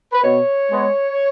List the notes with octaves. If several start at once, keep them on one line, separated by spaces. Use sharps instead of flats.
B4
B2 C#5
G#3 B3